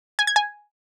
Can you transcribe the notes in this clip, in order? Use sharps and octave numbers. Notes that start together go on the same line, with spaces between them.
G#5
G#6
G#5